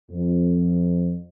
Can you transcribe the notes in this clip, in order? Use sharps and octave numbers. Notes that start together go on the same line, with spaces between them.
F2